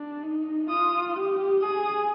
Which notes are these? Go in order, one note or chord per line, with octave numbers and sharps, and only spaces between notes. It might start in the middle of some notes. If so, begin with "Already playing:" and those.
Already playing: D4
D#4
F4 D#6
G4
G#4 D#6